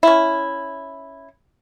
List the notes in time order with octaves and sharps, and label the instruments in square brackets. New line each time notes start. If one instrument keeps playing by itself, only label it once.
[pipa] C#4 E4